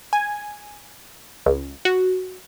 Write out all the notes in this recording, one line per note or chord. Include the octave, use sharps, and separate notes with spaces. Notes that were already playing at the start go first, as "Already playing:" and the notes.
G#5
C#2
F#4